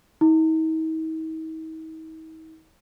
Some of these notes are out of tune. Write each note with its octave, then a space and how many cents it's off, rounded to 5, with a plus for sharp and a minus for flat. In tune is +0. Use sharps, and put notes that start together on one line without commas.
D#4 +45